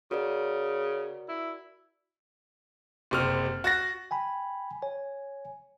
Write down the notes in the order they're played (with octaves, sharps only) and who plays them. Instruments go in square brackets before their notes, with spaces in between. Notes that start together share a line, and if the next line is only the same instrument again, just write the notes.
[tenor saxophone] C#3 [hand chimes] F#4 A#4 D5
[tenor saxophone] E4
[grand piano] F#1 C3 F6
F#4 A6 A#6
[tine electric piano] G5 G#5 B5
C#5 G#5